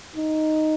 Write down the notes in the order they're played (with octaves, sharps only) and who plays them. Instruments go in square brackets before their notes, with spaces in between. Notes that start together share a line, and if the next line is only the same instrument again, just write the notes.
[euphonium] D#4